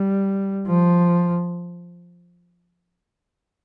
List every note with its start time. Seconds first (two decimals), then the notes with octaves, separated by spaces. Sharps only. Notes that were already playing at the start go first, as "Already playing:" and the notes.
Already playing: G3
0.67 F3